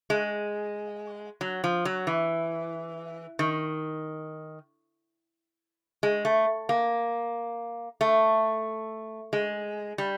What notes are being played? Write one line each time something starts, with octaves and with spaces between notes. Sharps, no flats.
G#3
F#3
F3
F#3
E3
D#3
G#3
A3
A#3
A3
G#3
G3